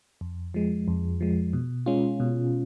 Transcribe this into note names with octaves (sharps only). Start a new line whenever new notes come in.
F2
F3 G#3
F2
F3 G#3
B2
G#3 C#4 F4
B2